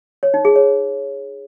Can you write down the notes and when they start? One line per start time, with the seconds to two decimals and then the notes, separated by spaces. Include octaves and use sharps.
0.23 C#5
0.34 D#4
0.45 G#4
0.56 C#5